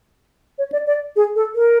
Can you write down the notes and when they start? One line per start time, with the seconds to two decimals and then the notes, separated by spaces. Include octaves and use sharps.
0.58 C#5
0.72 D5
0.87 D5
1.16 G#4
1.36 A4
1.55 A#4